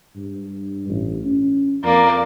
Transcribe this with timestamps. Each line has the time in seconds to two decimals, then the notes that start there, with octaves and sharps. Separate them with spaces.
0.16 G2
0.89 A1
1.25 C#4
1.84 F2 A#3 D5